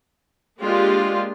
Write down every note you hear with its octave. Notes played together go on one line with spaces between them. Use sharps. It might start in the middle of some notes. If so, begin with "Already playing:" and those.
G#3 A#3 D4 F4 G4